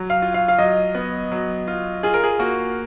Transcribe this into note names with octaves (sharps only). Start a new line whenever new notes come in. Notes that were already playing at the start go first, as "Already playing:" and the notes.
Already playing: F#3
F5
F4
F5
F5
F#3 D#5
B3
F#3
F4
F4 G#4
A#4
G#4
A#3 F#4